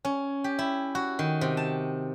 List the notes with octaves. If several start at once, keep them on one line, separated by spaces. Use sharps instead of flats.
C#4
G4
E4
F#4
D#3
C3
A5